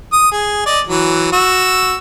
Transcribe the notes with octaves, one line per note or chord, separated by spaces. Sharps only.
D#6
G#4
D5 D#5
E3 F#3
F#4 E6